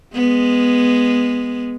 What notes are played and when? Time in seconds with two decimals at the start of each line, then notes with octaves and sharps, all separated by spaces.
0.14 G#3 B3